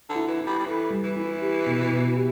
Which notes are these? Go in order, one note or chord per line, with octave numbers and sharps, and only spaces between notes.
D3
E4
E3
E4
G3
G3
E3 A4
G3
E3
E4
G4
B2
B2
G4